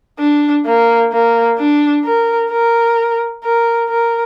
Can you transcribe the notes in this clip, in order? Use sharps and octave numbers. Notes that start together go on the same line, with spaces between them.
D4
A#3
A#3
D4
A#4
A#4
A#4
A#4